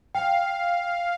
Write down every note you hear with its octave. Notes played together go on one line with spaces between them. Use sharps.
F5 G5